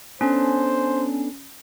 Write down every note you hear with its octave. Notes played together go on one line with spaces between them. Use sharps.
B3 C#4 D4 A4 C5